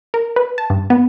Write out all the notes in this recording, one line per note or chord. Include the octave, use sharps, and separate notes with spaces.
A#4
B4
A5
G2
B3